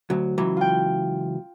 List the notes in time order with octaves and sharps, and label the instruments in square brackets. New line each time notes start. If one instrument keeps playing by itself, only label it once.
[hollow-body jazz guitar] D2 F#3
C#2 E3 F#3
[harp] F4 G5